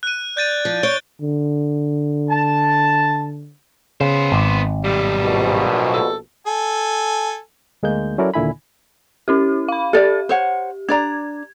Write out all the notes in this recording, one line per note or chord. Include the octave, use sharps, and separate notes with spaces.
F#6 D#7
D5 G6 A6 D#7
F3
C#5 G6 D7 G7
D3
A5
C#3 B3 C5
G#1
B1 A2 G3
A#1 B2
A4
A4 G#5
D2 G#3 A#3 G6
F#3 C#4 E4 A4 A#4 D5
D#2 A#2 D3 E4 G#5 B5
C#4 E4 G4
F5 B5
G4 A4 D5
C5 C#5 F#5
D4 D5 A#5 G#6